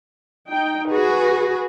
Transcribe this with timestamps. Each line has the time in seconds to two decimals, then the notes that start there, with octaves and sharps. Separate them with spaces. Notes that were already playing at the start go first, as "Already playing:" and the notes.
0.49 D#4 G5
0.90 F#4 G#4 B4